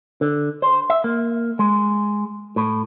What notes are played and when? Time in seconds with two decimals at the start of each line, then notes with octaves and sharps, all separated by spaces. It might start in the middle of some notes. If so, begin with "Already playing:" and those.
0.21 D3
0.62 C5
0.90 E5
1.04 A#3
1.59 G#3
2.56 A2